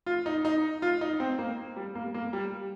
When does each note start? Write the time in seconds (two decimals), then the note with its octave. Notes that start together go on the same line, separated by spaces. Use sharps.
0.06 F4
0.26 D#4
0.45 D#4
0.82 F4
1.01 D#4
1.20 C4
1.39 A#3
1.76 G3
1.95 A#3
2.14 A#3
2.33 G3